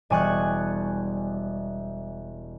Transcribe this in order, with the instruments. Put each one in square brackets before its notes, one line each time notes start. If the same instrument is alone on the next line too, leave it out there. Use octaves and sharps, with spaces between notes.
[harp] E1 G3 G#5 C#6 F#6